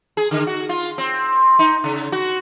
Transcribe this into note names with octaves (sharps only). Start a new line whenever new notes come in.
G#4
D3
F#4
F4
C4
D#4
C#3
F#4